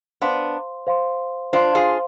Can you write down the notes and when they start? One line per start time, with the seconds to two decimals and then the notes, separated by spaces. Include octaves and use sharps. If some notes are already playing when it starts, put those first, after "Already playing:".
0.22 B3 D4 C5 F5 C6
0.87 C5 F5 C6
1.53 D4 F4 C5 F5 C6
1.75 F4 G#4